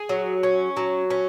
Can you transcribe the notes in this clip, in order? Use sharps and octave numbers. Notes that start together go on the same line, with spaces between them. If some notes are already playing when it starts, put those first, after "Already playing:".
Already playing: G#4
F#3
C#4
F#3
C#4